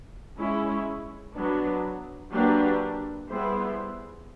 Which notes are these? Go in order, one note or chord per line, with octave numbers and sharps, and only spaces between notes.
G#3 C#4 E4
F#3 B3 D4
F#3 A#3 D4 G4 B4
G3 B3 E4 G#4 C5